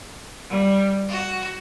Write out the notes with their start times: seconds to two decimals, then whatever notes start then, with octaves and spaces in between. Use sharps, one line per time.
0.48 G3
1.08 F#4